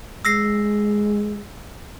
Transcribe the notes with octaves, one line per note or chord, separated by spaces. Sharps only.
G#3 E6 A#6 C7